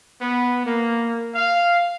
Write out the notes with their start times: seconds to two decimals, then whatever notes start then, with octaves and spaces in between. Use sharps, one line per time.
0.20 B3
0.66 A#3
1.35 F5